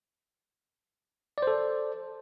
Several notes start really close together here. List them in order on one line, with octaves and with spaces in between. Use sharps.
D5 C5 A4